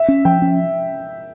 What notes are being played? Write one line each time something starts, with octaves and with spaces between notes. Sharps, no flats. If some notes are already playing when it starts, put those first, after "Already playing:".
Already playing: E5
C#4
F3 G5
C#4